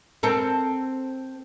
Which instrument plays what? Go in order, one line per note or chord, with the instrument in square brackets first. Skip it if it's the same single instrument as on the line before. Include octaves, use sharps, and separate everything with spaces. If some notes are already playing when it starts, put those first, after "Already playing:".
[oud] C4 A4 A#4